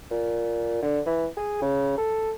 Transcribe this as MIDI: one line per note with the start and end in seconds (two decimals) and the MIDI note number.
0.11 0.79 46
0.83 0.99 50
1.06 1.26 52
1.37 1.60 68
1.62 1.93 49
1.98 2.31 69